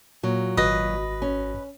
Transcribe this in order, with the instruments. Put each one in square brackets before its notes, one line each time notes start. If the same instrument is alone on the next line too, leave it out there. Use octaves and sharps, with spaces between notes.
[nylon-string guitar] A#2 F#3
[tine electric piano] G#1 F#4 A#6 [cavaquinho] B4 D#5
[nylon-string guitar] C#4